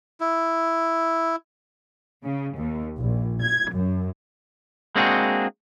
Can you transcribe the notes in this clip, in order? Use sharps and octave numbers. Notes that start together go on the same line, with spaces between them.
E4
C#3
D#2
A#1
G#6
F#2
G#3 A#3 C4 D4 F#4 G#4